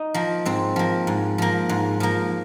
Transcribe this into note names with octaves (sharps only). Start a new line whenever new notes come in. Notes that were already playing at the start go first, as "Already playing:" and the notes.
Already playing: D#4
F3 A#3
G#2 C4
F3 A#3
G#2
F3 A#3
G#2
F3 A#3